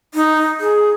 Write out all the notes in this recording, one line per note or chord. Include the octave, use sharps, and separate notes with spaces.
D#4
G#4